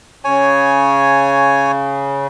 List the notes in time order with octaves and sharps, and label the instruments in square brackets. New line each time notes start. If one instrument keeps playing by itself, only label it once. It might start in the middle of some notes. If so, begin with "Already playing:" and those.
[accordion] C#3 [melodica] C#5 G#5